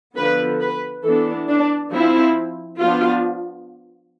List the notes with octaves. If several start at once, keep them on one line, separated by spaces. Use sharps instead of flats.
D3 F3 B3 B4
B4
E3 B3 D4 A4
D4
F3 C4 E4
F3 B3 D4 F4